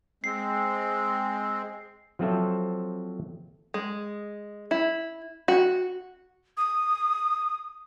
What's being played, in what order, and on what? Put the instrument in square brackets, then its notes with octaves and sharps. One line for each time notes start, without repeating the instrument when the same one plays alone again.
[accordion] G#3 C4 [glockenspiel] C7
[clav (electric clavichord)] F3 F#3 C4 F4 A4 E5
[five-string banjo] G#3
E4
F#4
[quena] D#6